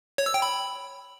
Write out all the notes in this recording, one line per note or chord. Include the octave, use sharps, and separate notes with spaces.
C#5
E6
G5
B5